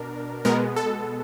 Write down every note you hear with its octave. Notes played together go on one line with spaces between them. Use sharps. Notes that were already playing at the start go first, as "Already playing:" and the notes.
Already playing: B2 D4 A#4
B2 G#3 B3 A#4
A4